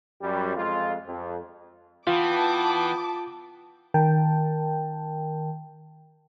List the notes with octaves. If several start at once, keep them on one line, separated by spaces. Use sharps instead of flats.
F#2 G3
F2 G#3 F4
F2
E3 B3 F4 G5 A5 D6
D#3 A#4 G5 A5